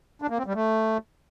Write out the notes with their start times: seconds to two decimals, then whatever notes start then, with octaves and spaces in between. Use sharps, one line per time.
0.22 D4
0.30 A#3
0.38 C4
0.46 G3
0.54 A3